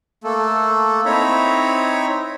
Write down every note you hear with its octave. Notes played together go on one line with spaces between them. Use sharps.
A3 A#3 A4
C4 D#4 E4 C#5 A#5 B5